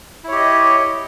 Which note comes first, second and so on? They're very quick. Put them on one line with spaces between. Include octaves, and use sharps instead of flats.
E4 C#5 G4 D#5